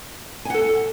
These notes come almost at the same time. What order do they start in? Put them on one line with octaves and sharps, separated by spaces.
G#5 F#5 A4